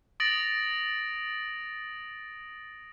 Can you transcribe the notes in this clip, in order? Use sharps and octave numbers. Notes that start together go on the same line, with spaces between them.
D#6 A6 A#6 D7 F#7